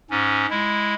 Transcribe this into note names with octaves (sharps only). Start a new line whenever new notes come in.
G#2 C#4
G#3 E4